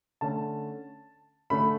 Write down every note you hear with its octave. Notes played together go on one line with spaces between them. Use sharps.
D3 A3 C#4 A5
D3 A3 C#4 B5